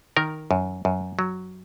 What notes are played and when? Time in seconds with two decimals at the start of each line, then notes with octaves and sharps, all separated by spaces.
0.17 D#3 A#4
0.51 F#2
0.85 F#2
1.19 F#3